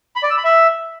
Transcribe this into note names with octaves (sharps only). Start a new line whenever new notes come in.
B5
D5
E6
B5
E5